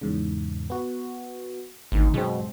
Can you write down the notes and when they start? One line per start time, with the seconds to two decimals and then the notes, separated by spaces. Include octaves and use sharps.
0.01 E2 G#2 C#3
0.70 B3 F#4
1.92 G#1 D2 D#3
2.14 F#2 B2 G#3 C4